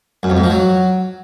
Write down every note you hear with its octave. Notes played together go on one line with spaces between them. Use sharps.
F#2
F2
G#2
F3
F#3